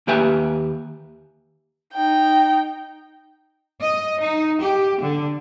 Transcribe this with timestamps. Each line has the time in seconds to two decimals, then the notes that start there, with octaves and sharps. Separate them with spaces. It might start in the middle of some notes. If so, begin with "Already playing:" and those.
0.07 D#2 A#3 G4 B4 E5 G#5
1.94 D#4 G5
3.81 D#5
4.19 D#4
4.59 G4
4.99 D3